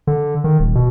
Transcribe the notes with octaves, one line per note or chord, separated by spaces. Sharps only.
D3
D#3
D#1
B2